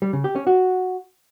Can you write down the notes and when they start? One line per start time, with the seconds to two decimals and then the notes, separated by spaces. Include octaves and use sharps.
0.02 G3
0.13 C#3
0.24 G4
0.35 C#4
0.47 F#4